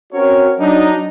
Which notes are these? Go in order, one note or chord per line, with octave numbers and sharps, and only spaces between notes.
C4 C#4 F#4 A#4 C#5
F#3 D4 D#4